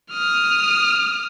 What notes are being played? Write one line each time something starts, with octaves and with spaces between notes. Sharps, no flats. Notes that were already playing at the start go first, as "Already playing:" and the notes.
D#6 F6